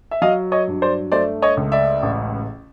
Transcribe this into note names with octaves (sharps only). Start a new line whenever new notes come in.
E5
F#3 D#5 F5
C#5 D#5
G2
C5 D5
A3 C5 D5
C#5 D#5
C#2
D5 E5
A1